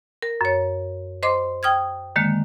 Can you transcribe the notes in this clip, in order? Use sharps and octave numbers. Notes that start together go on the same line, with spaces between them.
A#4
F#2 C#5
C5 D#5 C6 D6
G5 D#6 F6 G#6
D3 D#3 G#3 A#3